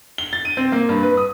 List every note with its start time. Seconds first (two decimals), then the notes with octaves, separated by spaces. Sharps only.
0.18 G7
0.33 A6
0.45 D#7
0.57 C4
0.72 A#3
0.89 G2
1.03 B4
1.17 D#6